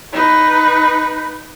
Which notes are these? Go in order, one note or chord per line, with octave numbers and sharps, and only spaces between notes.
D#4 B4